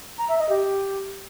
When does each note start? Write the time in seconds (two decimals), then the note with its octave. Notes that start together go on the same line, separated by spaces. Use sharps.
0.18 A#5
0.29 E5
0.39 D#5
0.49 G4